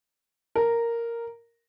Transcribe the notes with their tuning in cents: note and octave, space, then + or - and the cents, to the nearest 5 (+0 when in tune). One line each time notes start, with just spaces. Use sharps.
A#4 -5